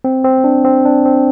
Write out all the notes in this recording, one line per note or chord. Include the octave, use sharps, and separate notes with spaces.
C4
C4
D4
C4
D4
C4